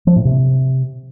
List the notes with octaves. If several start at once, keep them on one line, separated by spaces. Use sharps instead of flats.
F3
A2
C3